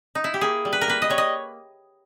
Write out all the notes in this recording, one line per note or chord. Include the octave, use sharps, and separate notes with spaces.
D#4
E4
G4
A#3 G#4
G3
B4
A#4
A#3 B4
D#5
G3 C#5
D#5